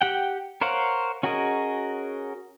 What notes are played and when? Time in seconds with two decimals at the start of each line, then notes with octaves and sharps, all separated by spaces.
0.01 G4 F#5 G5
0.61 A#4 C5 C#5 F5 F#5
1.23 C#4 F#4 G#4 A#4 D#5